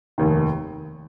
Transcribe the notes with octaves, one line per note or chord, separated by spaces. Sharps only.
F1 D#2 D#3